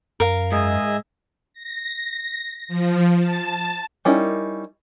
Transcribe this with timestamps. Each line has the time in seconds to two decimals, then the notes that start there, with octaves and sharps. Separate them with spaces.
0.20 F#2 A#4 F5
0.52 G#2 G#4 D#5 E5
1.54 A#6
2.68 F3
3.17 A5
4.05 G3 C#4 D#4 E4 A#4